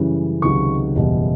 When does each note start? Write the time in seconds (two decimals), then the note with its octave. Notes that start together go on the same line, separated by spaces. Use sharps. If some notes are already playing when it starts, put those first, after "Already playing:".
Already playing: F#2 C#3 E3 G3
0.42 C#2 C3 D#3 F#3 C#6
0.95 F#1 E2 B2 G3